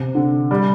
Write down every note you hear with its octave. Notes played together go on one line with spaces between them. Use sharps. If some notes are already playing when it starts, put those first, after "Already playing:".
Already playing: C3
D3
G3